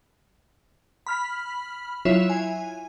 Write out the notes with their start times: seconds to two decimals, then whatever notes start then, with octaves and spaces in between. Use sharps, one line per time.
1.07 B5 F6 B6
2.05 F#3 E4 F4 C#5 E5
2.30 G#5